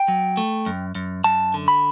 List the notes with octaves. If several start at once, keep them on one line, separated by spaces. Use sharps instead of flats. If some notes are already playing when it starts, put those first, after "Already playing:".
Already playing: G5
F#3
A3
F#2
F#2
F#2 A5
D3
B5